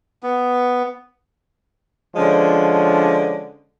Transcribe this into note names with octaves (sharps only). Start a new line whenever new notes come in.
B3
D3 F3 G#3 C#4 D4